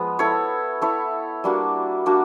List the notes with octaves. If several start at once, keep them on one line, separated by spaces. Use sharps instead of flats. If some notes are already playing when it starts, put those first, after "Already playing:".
Already playing: F3 G#3 B3
E4 A4 C#5
E4 A4 C#5
G3 A#3 D4 F#4
G3 A#3 D4 F#4